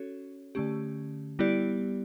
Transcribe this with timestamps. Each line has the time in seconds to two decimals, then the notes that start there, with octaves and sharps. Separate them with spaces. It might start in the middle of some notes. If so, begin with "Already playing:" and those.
Already playing: C#4 F#4 A4 C#5
0.55 D3 A3 C#4 G4
1.39 G3 B3 E4 G4 D5